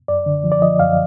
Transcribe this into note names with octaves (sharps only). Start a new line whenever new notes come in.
F#2 D5
D3
F3
D5
F3 D#5
F#2 F5